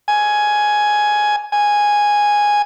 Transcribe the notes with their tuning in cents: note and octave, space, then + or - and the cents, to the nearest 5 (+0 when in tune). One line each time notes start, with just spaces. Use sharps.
G#5 +10
G#5 -5